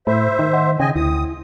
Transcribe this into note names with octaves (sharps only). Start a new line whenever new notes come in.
A2 C5 E5 B5
D#3
D#5 F#5 C6
C#3 D#5 G5 G#5
D2 E4 D#6